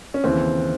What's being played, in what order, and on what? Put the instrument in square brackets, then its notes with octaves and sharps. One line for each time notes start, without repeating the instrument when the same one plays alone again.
[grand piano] C#4
D#2 C#3 E3 C4